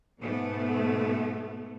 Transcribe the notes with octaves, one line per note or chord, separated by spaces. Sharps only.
G#2 B2 A3 B3